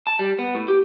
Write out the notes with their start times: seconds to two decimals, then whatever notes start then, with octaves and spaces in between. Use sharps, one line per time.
0.07 A5
0.19 G3
0.39 B3
0.55 A2
0.68 G4